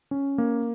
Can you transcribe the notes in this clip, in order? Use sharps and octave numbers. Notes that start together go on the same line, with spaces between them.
C#4
A#3